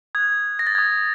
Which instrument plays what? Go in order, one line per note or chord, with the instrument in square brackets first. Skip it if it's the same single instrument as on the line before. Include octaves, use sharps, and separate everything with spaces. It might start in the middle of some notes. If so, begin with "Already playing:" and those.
[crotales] D#6 F#6 G#6
A#6
A6
D#6 F#6 G#6